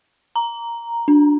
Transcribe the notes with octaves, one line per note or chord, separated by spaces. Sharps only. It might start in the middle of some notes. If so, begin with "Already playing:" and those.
A#5
D4